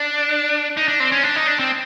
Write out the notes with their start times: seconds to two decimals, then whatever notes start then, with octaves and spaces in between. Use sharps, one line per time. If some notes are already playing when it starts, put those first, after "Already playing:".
Already playing: D4
0.77 D#4
0.88 D4
1.00 C4
1.12 C#4
1.23 D4
1.36 D#4
1.47 D4
1.59 C4